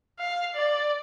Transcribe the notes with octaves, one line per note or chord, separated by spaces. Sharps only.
F5
D5